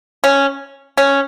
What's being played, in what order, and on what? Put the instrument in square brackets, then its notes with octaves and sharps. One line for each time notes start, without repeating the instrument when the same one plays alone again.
[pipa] C#4
C#4